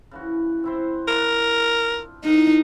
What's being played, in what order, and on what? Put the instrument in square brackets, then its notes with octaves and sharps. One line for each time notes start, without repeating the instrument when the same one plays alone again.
[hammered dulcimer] C#3 E3 F#4
C4 E4 C5
[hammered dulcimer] D4 E4 F4 [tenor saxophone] A#4
[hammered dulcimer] A2 A#4 F#5 [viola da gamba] D#4